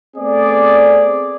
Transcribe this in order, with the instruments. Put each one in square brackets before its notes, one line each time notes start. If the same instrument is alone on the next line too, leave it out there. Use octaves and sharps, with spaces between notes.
[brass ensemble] A3 B3 C4 G#4 D5